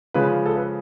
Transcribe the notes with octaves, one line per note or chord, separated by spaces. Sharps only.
C#3 F3 G#3 B4
A4
B4